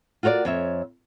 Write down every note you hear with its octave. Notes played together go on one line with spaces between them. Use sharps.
F4 F#4 A#4 C#5 D5
F2 C#5 E5